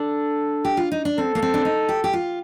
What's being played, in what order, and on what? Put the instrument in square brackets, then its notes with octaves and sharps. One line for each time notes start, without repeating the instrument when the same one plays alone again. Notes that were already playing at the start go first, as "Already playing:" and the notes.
Already playing: [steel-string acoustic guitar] D4 [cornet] A4
[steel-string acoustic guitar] G4
F4
D#4
D4
[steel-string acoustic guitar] C4 [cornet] A4
[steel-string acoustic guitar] A#3
C4
D4
D#4
G4
G4
F4